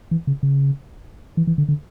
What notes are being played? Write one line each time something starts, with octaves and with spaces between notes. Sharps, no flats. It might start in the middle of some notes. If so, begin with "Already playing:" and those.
E3
C#3
C#3
E3
E3
D3
D3